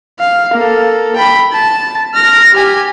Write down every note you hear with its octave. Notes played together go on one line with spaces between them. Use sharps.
F5
A#3 A4
G5 B5
A5
F6 A#6
G4 G#5